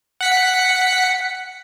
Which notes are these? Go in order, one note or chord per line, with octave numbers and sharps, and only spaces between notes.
F#5 B6 C#7